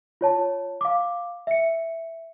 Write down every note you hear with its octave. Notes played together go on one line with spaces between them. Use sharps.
F4 C#5 A5
F5 D6
E5 C#7